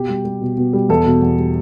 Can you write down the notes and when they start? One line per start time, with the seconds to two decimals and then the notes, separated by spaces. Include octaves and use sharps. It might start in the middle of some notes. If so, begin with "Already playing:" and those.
Already playing: B2 G4
0.09 G3
0.25 G3
0.41 B2
0.57 B2
0.73 G3
0.89 E2 A4
1.06 B2
1.22 E2
1.38 G3